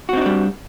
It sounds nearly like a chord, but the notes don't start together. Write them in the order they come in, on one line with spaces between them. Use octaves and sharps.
F#4 C4 D#4 D4 G3